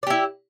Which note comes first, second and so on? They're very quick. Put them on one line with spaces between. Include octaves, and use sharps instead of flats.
D5 G4 E4